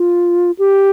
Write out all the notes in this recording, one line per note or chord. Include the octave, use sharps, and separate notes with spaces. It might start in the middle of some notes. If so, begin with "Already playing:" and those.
Already playing: F4
G4